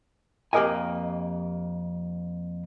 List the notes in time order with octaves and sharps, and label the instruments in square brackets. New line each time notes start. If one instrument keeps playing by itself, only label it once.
[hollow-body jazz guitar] F2 A#3 G4 A#4 D#5 G#5